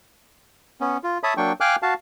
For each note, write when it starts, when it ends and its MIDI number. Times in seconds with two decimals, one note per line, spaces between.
0.81 0.97 59
0.81 0.97 61
1.04 1.18 65
1.23 1.34 73
1.23 1.34 76
1.23 1.34 81
1.23 1.34 83
1.23 1.34 87
1.37 1.52 54
1.37 1.52 58
1.37 1.52 62
1.37 1.52 79
1.37 1.52 85
1.61 1.76 77
1.61 1.76 79
1.61 1.76 80
1.61 1.76 86
1.61 1.76 89
1.61 1.76 90
1.82 1.94 66
1.82 1.94 77
1.82 1.94 81